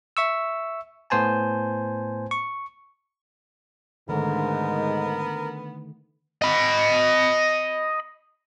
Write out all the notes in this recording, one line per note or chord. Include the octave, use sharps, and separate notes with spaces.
E5 C#6 E6
A2 B3 C5 G#5 A5
C#6
G#2 D3 D#3 A3 B3 A#4
D#5 B5